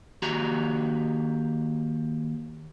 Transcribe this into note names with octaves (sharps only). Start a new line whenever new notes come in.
D#2 F#4 G4 A#5